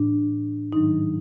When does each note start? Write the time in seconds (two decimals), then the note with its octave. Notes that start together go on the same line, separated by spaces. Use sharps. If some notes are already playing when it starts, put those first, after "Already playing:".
Already playing: A2 E3 D4
0.73 G#2 D#3 F#3 D#4